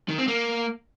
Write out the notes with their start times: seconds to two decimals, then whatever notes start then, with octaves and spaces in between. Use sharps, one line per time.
0.09 D#3
0.18 C4
0.28 A#3